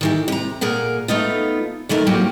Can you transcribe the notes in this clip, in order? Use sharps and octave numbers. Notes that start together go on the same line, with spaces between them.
D#3 E3 G4
C3 A#5
A#2 G#4 A#4 F#5
A3 B3 D#4 F4
D#3 E3 A3 A#4
F#3 G3 A#3 C4 C#4 G4